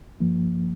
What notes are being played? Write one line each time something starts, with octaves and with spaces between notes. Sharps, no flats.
G2 F3 A#3